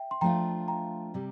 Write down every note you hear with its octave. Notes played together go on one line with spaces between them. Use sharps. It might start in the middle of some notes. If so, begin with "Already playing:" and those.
Already playing: E5 G5
C6
F3 A3 D4 F4 G5 A#5
G5 A#5
C3 G3